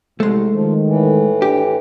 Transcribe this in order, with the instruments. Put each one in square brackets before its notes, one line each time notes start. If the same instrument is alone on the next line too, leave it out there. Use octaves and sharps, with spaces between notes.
[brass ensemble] C2 [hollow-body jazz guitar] G#3 A3
[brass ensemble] D#3 [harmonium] F3
[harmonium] A2 E3
[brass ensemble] D4 [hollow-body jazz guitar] G4